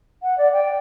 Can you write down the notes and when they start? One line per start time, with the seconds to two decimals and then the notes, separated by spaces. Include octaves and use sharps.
0.22 F#5
0.37 D5
0.53 G5